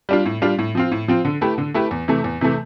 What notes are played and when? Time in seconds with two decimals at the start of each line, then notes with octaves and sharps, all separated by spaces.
0.09 G3 D4 F4
0.26 A2
0.42 G3 D4 F4
0.58 A2
0.75 F3 C4 F4
0.92 A2
1.08 F3 C4 F4
1.25 D3
1.41 A3 E4 G4 B4
1.58 D3
1.74 A3 E4 G4 B4
1.91 E2
2.08 C3 E3 A3
2.24 E2
2.41 C3 E3 A3